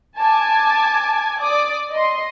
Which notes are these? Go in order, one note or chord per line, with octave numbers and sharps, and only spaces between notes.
G#5 A5 D6 G#6
D5 D6 D#6
D#5 C6